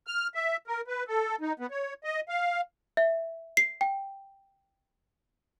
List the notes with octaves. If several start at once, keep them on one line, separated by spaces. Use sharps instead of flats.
F6
E5
A#4
B4
A4
D#4
B3
C#5
D#5
F5
E5
C7
G5